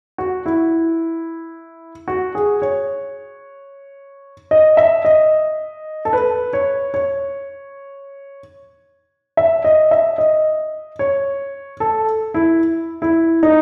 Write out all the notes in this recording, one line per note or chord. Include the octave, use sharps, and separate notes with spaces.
F#4
E4
F#4
G#4
C#5
D#5
E5
D#5
A4
B4
C#5
C#5
E5
D#5
E5
D#5
C#5
A4
E4
E4
D#4